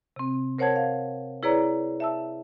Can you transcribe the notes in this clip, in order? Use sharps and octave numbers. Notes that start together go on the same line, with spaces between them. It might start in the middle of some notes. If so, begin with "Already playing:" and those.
C3 C4
A#4 C5 C#5 F#5 A5 G#6
F5
E4 G#4 B4 C#5 D5 A#5
E5 A5 E6